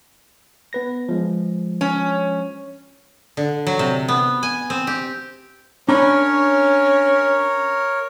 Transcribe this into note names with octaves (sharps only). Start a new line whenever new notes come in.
B3 B4 A#6
F3 G#3
C#4
D3
F#3
C3
B3
G#5
C4
G4
C#4 D4 A#4 C#5 A#5 B5